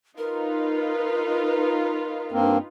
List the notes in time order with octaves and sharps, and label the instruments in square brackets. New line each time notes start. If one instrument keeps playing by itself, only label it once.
[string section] D#4 F4 B4 [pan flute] A#4
[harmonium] G2 A#3 C4